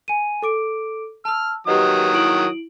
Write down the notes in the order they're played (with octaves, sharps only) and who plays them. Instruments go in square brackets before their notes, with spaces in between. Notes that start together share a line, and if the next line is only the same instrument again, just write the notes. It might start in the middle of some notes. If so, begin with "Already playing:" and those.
[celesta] G#5 D#7
A4 D6 D7
[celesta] A5 E6 [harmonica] F6
[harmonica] D#3 F#3 D#6 [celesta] G4 B4 D#5
[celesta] E4 D7 F#7